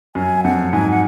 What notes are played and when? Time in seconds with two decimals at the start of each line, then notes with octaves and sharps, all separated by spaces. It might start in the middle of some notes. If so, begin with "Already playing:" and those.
0.15 F#2 G#5
0.43 F2 F#5
0.72 G#2 G#5
0.91 F#5